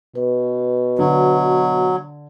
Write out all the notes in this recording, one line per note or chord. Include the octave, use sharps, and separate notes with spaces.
B2 B4
D3 F#3